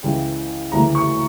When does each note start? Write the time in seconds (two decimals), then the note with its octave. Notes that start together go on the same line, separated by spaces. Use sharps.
0.03 C#2 C#3 E3 G5
0.72 D2 C#3 E3 A#5
0.95 C#6